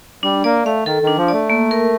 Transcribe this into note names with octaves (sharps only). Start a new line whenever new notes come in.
G3 D4
A#3 D5
A3 F5
D#3 A4
D#3 D4
F3
A3 D5
A#3
A#4